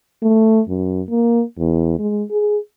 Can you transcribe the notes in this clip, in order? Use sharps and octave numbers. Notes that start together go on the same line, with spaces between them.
A3
F#2
A#3
E2
G#3
G#4